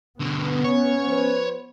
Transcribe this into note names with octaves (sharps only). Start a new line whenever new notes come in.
B2 D3 B3
C#4 C#5
F3 B4 C5